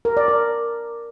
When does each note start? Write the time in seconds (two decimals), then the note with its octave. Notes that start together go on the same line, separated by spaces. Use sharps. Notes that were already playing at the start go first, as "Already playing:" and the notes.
0.05 A#4
0.17 D5
0.28 A#4